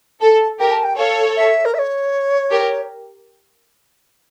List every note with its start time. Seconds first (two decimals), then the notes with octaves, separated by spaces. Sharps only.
0.21 A4 A5
0.59 G4 A#4 G5
0.71 A5
0.84 G5
0.97 A4 C#5 F5
1.36 E5
1.65 A#4
1.74 E5
1.78 C#5
2.50 G4 A#4